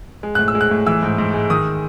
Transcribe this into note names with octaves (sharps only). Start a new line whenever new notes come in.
G#3
A2 F#6
E6
G#3
F#6
A2
E3 E6
G#2
G#2
G#3
D#3 D#6